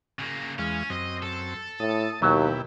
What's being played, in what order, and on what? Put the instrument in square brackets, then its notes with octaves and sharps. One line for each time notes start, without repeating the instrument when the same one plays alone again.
[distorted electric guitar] C#3 A#3
[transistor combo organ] E2 G#3 F5 [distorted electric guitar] C#4
[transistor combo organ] F#2 C4 [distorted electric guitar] D#5
[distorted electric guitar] A4
[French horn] A2 [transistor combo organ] A5 D#6
[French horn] D#2 [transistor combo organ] B2 E4 G4 [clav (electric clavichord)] F#3